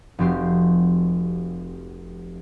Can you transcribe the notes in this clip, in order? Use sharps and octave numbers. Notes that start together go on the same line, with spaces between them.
F1 F3 C4 F#4 G4 C6